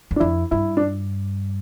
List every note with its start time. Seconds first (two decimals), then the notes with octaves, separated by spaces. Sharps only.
0.11 E2
0.16 D4
0.20 F2 E4
0.51 G2 E4
0.77 D4